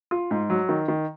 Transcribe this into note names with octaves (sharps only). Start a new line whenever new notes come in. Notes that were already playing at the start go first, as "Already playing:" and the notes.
F4
G#2
F#3
D#3
D#3